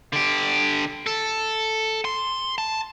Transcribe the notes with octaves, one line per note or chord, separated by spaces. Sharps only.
D3 G4
A4
C6
A5